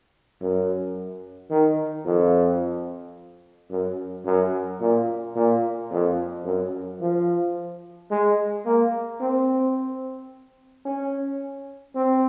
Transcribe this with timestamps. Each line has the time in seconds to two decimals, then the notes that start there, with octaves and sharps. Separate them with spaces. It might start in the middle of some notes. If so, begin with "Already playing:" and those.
0.41 F#2
1.50 D#3
2.06 F2
3.71 F#2
4.25 F#2
4.80 A#2
5.36 A#2
5.90 F2
6.45 F#2
7.00 F3
8.11 G#3
8.66 A#3
9.21 C4
10.85 C#4
11.95 C4